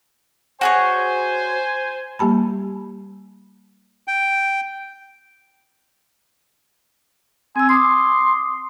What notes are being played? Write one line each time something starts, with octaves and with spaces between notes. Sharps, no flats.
F#4 G#4 C5 C#5 G#5
G3 A#3 G4 A5 B5
G5
C4 G#5 E6
C6 D6 D#6